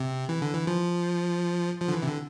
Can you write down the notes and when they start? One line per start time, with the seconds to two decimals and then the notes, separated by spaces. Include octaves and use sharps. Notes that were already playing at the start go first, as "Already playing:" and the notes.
Already playing: C3
0.29 E3
0.42 D3
0.54 E3
0.67 F3
1.81 F3
1.88 D3
1.93 E3
2.02 C3
2.07 D3